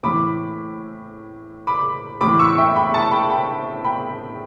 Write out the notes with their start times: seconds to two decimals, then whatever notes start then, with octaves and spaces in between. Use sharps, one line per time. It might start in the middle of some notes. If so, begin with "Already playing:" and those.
0.03 A2 E3 B5 D6
1.67 B5 D6
2.21 A2 E3 B5 D6
2.39 C#6 E6
2.58 E5 G5
2.75 G5 B5
2.94 A5 C#6
3.11 G5 B5
3.30 G5 B5
3.84 G5 B5